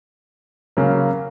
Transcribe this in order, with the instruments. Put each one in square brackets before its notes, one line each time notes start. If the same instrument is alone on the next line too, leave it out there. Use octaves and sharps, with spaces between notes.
[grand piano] C#3 F#3 A#3